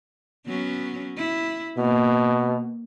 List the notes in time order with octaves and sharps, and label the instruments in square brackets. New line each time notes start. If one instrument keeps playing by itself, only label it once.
[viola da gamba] F#3 B3 C#4
E4
[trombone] B2 [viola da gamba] A#3